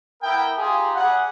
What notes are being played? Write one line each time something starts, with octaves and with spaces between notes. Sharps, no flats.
B3 E4 A#4 G5
D#4 F4 G4 G#4
G3 G#4 F#5